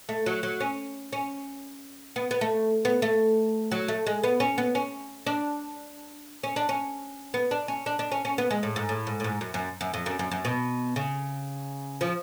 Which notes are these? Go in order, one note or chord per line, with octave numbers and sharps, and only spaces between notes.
A3
F#3
F#3
C#4
C#4
B3
B3
A3
B3
A3
F#3
A3
G#3
B3
C#4
B3
C#4
D4
C#4
D4
C#4
B3
D4
C#4
D4
D4
C#4
C#4
B3
G#3
A2
G#2
A2
G#2
A2
G#2
F#2
F#2
F#2
F2
F#2
F#2
F#2
B2
C#3
F3